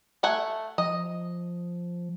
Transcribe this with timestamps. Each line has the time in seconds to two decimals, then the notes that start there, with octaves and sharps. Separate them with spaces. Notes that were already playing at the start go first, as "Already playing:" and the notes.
0.23 A3 F#5 G#5
0.78 F3 D#5